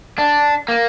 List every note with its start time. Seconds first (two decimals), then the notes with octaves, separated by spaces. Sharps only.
0.18 D4
0.68 A#3